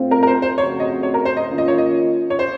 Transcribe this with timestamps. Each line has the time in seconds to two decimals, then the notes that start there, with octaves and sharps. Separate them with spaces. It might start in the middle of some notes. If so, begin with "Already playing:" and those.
Already playing: A2 A3 C4 F4
0.11 A#4
0.23 A#4
0.27 C5
0.42 C5
0.57 F2 C#3 A3 C4 F#4 C#5
0.80 D#5
1.03 C#5
1.14 A#4
1.25 C5
1.37 D#5
1.48 D#3 A#3 C#4 F4
1.58 D#5
1.68 C#5
1.78 D#5
2.30 C#5
2.39 C5